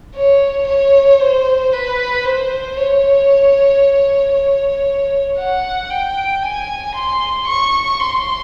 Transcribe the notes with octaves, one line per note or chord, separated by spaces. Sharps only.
C#5
C#5
C5
B4
C5
C#5
C#5
F#5
G5
G#5
C6
C#6
C6